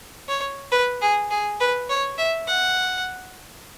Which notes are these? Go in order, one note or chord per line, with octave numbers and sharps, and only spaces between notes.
C#5
B4
G#4
G#4
B4
C#5
E5
F#5